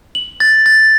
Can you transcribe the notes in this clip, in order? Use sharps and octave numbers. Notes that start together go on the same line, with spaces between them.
F#7
A6
A6